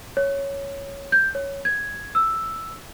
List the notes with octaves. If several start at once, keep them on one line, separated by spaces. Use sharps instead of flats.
C#5
G6
C#5
G#6
E6